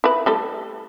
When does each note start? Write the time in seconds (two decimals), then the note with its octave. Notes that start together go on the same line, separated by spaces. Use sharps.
0.04 E4 B4
0.26 G3 A3 A4